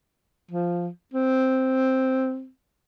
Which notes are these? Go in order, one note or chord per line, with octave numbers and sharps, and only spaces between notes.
F3
C4